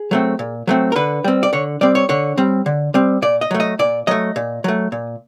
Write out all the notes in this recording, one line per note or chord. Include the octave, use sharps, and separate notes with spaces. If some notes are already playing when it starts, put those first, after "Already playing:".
Already playing: G#4
F#3 A3 C4
A#2
F#3 A3 C4
A#4
D3 B4
G3 C4
D5
D3 C#5
G3 C4 D5
C#5
D3 C#5
G3 C4
D3
G3 C4
A#2 D5
D#5
F#3 A3
D#5
A#2 D5
F#3 A3 D#5
A#2
F#3 A3
A#2